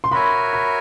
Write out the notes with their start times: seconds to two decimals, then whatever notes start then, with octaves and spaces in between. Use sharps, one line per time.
0.04 C6
0.11 F#4 A#4 C#5 E5 G#5 B5
0.53 B5